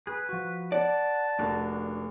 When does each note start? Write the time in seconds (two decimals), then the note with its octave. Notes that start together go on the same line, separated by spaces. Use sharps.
0.07 G#4 B4
0.29 F3 F#4
0.72 D5 F#5 A5
1.39 F1 A#3 D4 F#4